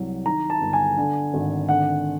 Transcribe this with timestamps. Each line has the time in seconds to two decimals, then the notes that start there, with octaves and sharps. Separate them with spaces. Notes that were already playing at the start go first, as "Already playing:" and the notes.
Already playing: C2 F#3
0.26 D#3 A#5
0.50 A5
0.61 G1
0.73 G#5
0.98 D3
1.34 G#1
1.69 D3 F#5